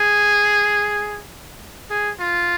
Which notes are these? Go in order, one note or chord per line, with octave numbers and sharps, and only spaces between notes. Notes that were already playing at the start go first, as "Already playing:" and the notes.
Already playing: G#4
G#4
F4